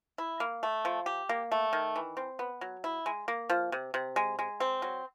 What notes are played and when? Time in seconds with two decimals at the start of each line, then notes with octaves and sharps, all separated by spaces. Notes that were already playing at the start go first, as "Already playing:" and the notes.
0.18 E4
0.40 A#3
0.63 A3
0.85 F3
1.06 G4
1.29 A#3
1.52 A3
1.73 D#3
1.96 E3
2.17 C4
2.39 B3
2.61 F#3
2.84 E4
3.06 G#3
3.28 A#3
3.50 F3
3.72 C3
3.94 C3
4.16 G#3
4.39 G#3
4.60 C4
4.82 F#3